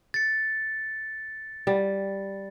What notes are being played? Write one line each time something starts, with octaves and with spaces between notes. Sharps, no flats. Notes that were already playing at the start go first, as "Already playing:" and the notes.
A6 C#7
G3